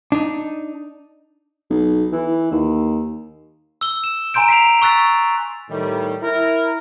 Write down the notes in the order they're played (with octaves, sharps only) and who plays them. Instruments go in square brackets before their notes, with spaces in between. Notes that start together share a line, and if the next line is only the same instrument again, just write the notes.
[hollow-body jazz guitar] D4 D#4
[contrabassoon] B1
E3
D#2
[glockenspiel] E6 G7
E7
G#5 A#5 C6 G6 D7
B6 C7 D7 F7
C#6 E6 F#6 A6 B6
[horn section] A2 D#3 G3
E4 A#4